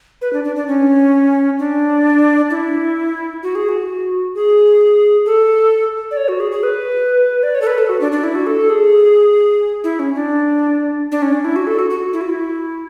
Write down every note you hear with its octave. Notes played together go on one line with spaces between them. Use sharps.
B4
D4
D4
D4
C#4
D4
E4
F#4
G#4
F#4
G#4
A4
D5
C#5
F#4
G#4
G#4
B4
D5
C#5
A4
B4
A4
F#4
D4
D4
E4
F#4
A4
G#4
E4
C#4
D4
D4
C#4
D4
E4
F#4
A4
F#4
F#4
E4
F#4
E4